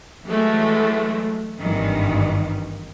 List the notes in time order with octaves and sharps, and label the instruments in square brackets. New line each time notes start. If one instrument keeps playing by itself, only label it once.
[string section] E3 F#3 G#3 A3
G#1 G2 D#3 E3